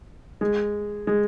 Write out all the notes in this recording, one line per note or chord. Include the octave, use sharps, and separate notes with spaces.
G#3
G#3